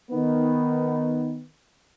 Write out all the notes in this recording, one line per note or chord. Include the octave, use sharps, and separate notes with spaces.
D#3 B3